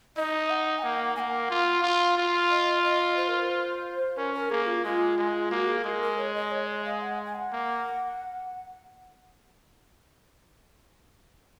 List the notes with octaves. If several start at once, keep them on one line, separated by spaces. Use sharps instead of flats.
D#4 D#5
F#5
G#5
A#3 F#5
A#3 F#5 G#5
F4 F5
F4
F4
D#5
D#5
C5
A#4
C5
C#4 A#4
A#4
A#3 G#4
F4
G#3 F4
G#3
A#3 F#4
G#4
G#3 A#4
A#4
C#5
D#5
C#5
D#5
F5
F#5
G#5
F#5
A#3